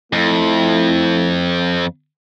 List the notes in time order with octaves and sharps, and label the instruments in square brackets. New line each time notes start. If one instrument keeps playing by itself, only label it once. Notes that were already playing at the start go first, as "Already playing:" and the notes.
[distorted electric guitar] F2 [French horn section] A3 E4